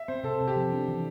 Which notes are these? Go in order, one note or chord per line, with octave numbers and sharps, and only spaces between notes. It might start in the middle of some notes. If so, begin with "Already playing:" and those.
Already playing: E5
C4 C5
C3 A4
C3
G4
F3
D4
E3